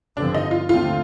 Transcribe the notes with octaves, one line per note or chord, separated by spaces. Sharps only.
G2 D3 F3 C4 D4
D#4
F4
D#2 D3 A3 C4 F4